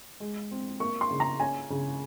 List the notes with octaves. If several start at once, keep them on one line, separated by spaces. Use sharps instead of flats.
G#3
C4
A#3 C#6
C6
C#3
A#5
C#4 G#5
C#3